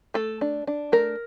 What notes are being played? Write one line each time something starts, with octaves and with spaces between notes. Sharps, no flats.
A3 A4
D4
D4
A3 A#4